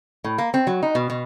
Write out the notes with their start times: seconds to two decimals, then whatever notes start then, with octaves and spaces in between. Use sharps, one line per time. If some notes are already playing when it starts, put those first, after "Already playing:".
0.24 A2
0.38 A#3
0.54 C4
0.67 F#3
0.82 D#4
0.95 B2
1.10 B2